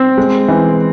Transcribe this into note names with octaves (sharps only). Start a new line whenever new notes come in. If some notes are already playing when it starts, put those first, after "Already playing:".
Already playing: C4
G#3
E3